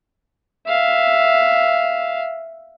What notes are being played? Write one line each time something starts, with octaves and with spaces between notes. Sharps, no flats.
E5 F5